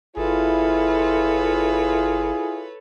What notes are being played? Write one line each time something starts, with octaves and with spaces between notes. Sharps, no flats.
G1 E4 F4 G#4 A4 B4 C#5